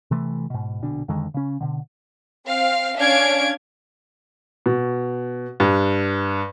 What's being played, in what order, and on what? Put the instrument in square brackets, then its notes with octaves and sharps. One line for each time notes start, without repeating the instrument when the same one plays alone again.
[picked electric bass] C3 E3 A3
G#2 B2
A#1 B2 D3 D4
F2 D3 D#3 G#3
C#3 C#4
B2 D3
[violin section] C4 F5
C#4 D4 F5 G#6 D7
[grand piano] B2
G2